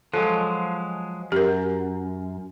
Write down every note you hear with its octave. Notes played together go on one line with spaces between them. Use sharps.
F3 F#3 G#3 A4
F#2 G4 A#4